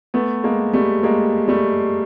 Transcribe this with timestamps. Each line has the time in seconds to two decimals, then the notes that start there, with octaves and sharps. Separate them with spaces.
0.14 A3 B3
0.44 G#3 A#3
0.73 G3 A3
1.03 G#3 A#3
1.48 G3 A3